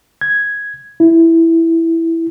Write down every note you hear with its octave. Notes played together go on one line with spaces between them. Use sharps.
G#6
E4